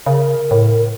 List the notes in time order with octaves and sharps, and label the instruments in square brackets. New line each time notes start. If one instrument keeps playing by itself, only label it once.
[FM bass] C#3 [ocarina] A#4
[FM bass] A2